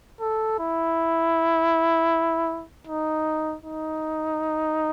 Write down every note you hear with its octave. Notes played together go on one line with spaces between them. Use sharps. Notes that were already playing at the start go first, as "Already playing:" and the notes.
A4
E4
D#4
D#4